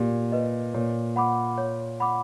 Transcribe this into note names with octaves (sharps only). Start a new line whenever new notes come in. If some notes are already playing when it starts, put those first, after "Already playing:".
Already playing: A#2 G4
B4 D#5
A#2 C#5
F#5 B5 D6
C#5
F#5 B5 D6